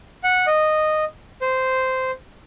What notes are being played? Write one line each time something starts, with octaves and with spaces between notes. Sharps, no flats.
F#5
D#5
C5